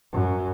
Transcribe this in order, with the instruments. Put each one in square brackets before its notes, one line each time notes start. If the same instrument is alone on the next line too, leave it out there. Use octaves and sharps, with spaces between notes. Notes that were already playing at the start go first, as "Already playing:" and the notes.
[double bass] F#2